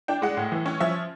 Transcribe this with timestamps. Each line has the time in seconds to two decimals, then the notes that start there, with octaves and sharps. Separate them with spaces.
0.08 D4 G5
0.22 G#3 F#5
0.37 A2
0.52 E3
0.66 C#4
0.80 F3 E5